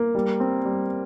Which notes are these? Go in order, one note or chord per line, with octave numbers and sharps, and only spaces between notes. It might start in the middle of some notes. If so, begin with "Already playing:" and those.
Already playing: A#3
G3
C4
G3